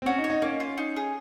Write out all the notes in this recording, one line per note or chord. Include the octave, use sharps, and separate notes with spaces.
C4
C#4 F#4
D#4
C#5
D#4
A#3 C#4
F4
D#4
G#4